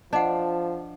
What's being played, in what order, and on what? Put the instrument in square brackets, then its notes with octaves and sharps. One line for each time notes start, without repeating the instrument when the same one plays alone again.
[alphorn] F3 [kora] D4 [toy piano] D#5 F#5